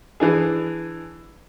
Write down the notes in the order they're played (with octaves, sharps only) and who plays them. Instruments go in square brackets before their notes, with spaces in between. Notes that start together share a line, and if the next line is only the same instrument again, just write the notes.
[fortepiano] E3 D4 G#4